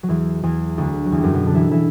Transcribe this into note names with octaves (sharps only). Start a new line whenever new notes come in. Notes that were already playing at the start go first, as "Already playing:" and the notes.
F#3
E2 E3
E2 E3
D2 D3
F#3
E2 E3
F#2 F#3 G3
B2 B3
D3 D4
E3 E4
E3 E4